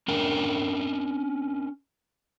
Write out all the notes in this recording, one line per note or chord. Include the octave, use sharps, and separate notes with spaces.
C#4 D4 A#4 G5 G#5